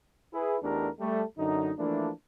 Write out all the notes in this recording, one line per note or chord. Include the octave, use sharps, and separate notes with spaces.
E4 G#4 B4
E2 A3 D4 D#4 G4 A#4
G3 A3
F#2 D3 D#4
E3 F3 A3 A#3 D4